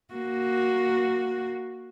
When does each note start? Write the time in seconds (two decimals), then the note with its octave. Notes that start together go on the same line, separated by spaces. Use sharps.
0.14 A#3 F#4